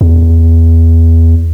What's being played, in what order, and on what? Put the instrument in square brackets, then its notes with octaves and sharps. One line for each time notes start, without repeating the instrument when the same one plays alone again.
[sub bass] E2